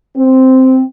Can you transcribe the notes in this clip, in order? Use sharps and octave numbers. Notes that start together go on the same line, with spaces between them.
C4